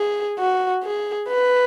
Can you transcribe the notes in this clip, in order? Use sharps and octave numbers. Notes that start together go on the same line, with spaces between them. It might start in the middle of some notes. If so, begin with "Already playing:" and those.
Already playing: G#4
F#4
G#4
B4